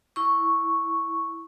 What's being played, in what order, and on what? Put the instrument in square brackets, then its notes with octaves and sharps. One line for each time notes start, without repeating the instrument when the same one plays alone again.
[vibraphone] E4 C#6